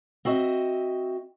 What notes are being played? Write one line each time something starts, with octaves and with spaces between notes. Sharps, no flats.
C4 F#4 D#5 E5